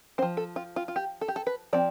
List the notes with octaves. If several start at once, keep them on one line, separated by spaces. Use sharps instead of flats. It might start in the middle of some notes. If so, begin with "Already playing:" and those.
C4 C5
F3
A4
F4
F4
F4
G4
A4
G4
A4
B4
F3 C4 D5